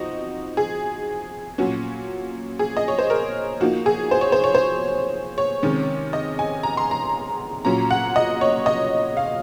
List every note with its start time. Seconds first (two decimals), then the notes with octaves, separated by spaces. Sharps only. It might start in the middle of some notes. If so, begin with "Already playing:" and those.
Already playing: F3 C4 D#4 F#4 D#5
0.57 G#4
1.58 A#2 F#3 C#4 F#4
2.59 G#4
2.77 D#5
2.88 C#5
2.99 C5
3.10 A#4
3.60 F3 A#3 D#4 F#4
3.86 G#4
4.11 C5
4.21 C#5
4.32 C5
4.44 C#5
4.55 C5
5.38 C#5
5.63 C3 D#3 G#3 C#4
6.13 D#5
6.39 G#5
6.63 A#5
6.77 C6
6.91 A#5
7.65 A#2 F#3 C#4 A#5
7.91 F#5
8.16 D#5
8.41 C#5
8.66 D#5
9.17 F5